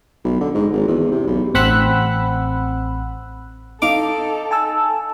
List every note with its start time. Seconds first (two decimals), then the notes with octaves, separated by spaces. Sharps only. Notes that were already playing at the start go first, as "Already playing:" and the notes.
0.24 B1
0.41 D3
0.55 G#2
0.73 G#1
0.88 E2
1.11 C3
1.27 B1
1.54 A1 C4 F#5 B5 E6 F#6
3.82 D#4 A4 F5 D6
4.51 G#5 A5 E6